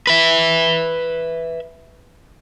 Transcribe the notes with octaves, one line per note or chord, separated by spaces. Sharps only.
B4 E5